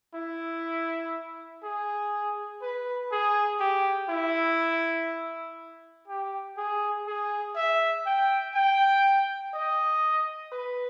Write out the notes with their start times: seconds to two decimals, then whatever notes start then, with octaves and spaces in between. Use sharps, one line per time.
0.15 E4
1.63 G#4
2.62 B4
3.11 G#4
3.60 G4
4.09 E4
6.08 G4
6.57 G#4
7.07 G#4
7.56 E5
8.06 G5
8.55 G5
9.54 D#5
10.53 B4